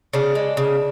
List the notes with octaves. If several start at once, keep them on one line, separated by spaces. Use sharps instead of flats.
C#3 D4
G#3
C#3